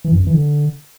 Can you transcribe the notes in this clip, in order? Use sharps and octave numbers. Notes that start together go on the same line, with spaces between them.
E3
F#2
F2
E3
D3